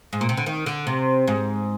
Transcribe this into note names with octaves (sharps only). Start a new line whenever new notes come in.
G#2
A#2
C3
D3
D#3
D3
C3
G#2